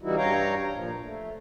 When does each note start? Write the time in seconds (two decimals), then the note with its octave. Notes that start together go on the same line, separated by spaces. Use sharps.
0.01 C#3 E3 G3 D#4 E4 F#4
0.16 G2 C#5 F5 G5 A#5
0.73 A#2 F3
1.02 A3